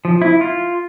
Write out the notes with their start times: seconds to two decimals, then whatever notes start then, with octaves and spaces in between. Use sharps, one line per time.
0.05 F3
0.22 E4
0.41 F4